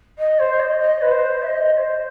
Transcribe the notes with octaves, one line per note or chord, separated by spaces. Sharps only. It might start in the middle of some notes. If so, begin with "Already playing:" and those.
D#5
C5
D#5
D#5
B4
C5
E5
D#5
D#5
C5